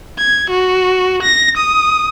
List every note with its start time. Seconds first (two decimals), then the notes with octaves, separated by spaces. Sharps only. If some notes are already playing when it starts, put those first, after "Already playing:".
0.18 G#6
0.50 F#4
1.22 A#6
1.57 D#6